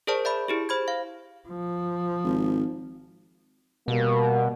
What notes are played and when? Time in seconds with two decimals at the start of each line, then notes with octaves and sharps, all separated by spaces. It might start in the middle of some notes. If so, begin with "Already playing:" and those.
0.07 G#4 A#4 C5 D5 A5
0.25 D5 E5 B5
0.48 E4 G4 G#4
0.69 C5 B5 G#6
0.88 F5
1.49 F3
2.24 G#1
3.88 B2 G3 A#3